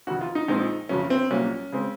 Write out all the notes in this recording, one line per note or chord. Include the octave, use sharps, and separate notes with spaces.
F1 F2 D#3 F#4
F4
D#4
A#1 A#2 G#3 C4 D#4
F#1 F2 C#3 F#3 C#4
C4
C2 A#2 F#3 A#3 C#4
C#3 G#3 C4